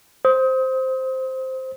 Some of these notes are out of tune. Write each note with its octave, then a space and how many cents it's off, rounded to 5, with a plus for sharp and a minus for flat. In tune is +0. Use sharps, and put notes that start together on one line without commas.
C5 +0 D#6 +35